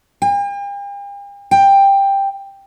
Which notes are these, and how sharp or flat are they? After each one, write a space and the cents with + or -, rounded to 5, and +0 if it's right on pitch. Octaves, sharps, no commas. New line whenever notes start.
G5 +45
G5 +10